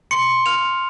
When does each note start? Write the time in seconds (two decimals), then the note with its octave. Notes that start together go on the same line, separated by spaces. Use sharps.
0.11 C6 C#7
0.46 F6 F7